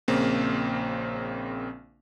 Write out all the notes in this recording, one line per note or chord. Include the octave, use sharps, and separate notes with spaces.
A#1 C#3 A#3 C4